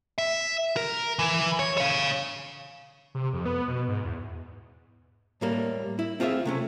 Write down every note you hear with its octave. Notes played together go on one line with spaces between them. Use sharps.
E5
A#4
E3
C#5
C#5 F5
C3
F2
B3
B2
G#2
E2
A2 G3 A#3
E4
C4 F4 G#4 C#5 E5
C3 A3 C#4